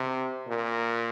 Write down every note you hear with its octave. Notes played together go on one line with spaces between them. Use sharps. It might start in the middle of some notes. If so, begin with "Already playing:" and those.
Already playing: C3
A#2